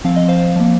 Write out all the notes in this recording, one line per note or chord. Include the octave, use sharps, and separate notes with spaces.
F3 C4 F5
D#5
C5 F5
F3 A#3